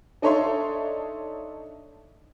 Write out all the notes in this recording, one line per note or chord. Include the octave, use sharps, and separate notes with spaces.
D4 D#4 A4 C#5 E5 C6